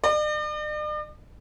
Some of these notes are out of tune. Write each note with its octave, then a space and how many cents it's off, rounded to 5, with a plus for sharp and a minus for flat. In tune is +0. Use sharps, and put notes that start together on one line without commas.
D5 +45